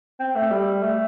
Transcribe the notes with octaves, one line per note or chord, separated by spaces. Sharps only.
C4
A3
G3
A3